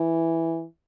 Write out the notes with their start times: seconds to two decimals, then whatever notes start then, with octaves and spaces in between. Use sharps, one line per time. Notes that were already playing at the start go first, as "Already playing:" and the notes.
Already playing: E3